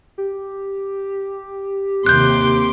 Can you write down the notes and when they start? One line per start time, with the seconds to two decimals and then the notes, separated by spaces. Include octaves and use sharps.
0.18 G4
2.06 D#2 C3 C6 D6 F#6 G6